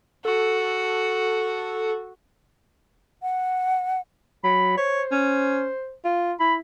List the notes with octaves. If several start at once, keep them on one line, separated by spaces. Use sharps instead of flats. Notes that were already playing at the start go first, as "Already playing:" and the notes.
F#4 A4
F#5
F#3 B5
C5 C#5
C#4
F4
E4 B5